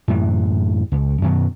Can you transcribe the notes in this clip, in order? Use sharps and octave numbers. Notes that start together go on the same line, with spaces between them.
F#2 A2 C3 E3
C#2
F#2 B2 D#3 F#3